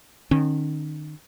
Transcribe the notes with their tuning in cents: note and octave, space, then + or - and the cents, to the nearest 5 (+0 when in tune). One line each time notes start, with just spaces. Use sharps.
D#3 -40 C#4 -35